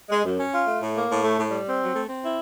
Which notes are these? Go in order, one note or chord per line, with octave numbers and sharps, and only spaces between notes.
G#3
F#2
C#4
F4
A3
A2
A#3
A2
A3
A2
G3
C4
F#3
A3
C4
E4